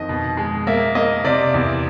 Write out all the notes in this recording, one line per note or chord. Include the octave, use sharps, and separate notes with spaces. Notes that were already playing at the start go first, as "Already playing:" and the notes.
Already playing: F2 D#3 D#5
B2
G#3
A#3 E5
A#3 D#5
C3 D5
E2